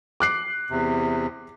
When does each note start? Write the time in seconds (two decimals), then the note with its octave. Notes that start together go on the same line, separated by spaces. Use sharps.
0.20 D6 F#6 C7
0.70 E2 C3